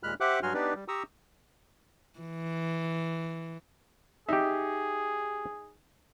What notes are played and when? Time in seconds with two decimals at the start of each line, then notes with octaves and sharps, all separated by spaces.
0.03 D#2 A#2 G#3 B5 F6 F#6
0.20 G4 C5 E5 F#5 D6 F#6
0.43 G2 F#3 F#4 G#5 C6 F6
0.54 B3 D4 D#4 G4 B4 D5
0.76 G3
0.88 G4 A#5 C#6 D#6 E6
2.19 E3
4.29 D#4 G4 G#4 E5